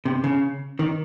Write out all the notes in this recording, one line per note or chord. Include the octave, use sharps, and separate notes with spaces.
C3
C#3
D#3